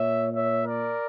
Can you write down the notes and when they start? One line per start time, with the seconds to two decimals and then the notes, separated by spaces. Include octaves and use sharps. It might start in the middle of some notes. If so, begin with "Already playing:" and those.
Already playing: A#2 C#5 E5
0.32 C#5 E5
0.65 A#4 D5